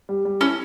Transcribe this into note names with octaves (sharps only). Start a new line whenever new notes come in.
G3
G3
C#4 E4